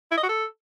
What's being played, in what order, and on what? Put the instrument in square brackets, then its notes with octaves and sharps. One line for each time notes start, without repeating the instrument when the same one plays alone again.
[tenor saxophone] E4
D#5
F#4
A4